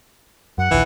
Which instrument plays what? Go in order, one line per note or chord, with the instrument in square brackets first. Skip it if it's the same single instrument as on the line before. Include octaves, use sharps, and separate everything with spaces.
[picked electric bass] F#2 [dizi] F#5
[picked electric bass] A#1 D#2 [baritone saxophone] E3